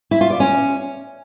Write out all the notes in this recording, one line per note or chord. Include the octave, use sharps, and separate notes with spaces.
E4
F4
D5
C#4